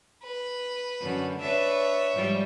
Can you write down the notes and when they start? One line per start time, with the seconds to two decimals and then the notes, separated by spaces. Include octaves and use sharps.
0.23 B4
1.01 F#2 D3
1.41 D4 B4 C#5 E5
2.14 G#2 F3 G3